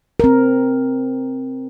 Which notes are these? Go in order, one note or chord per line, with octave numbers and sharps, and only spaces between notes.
C4 A#4